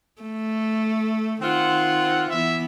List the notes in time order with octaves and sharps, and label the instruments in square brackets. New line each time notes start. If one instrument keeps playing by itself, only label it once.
[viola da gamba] A3
[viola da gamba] D#3 [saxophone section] C4 F4 [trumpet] F#5
[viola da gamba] E3 B3 [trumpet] E5